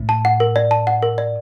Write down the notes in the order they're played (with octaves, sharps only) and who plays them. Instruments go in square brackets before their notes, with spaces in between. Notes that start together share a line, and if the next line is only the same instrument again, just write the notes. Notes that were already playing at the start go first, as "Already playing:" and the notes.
Already playing: [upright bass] A2
[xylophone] A5
F#5
A#4
D5
A5
F#5
A#4
D5